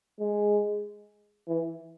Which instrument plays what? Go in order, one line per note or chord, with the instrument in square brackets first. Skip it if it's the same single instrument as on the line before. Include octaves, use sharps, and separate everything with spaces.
[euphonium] G#3
E3